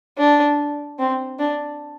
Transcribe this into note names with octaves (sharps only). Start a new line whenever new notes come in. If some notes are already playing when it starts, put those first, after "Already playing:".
D4
C4
D4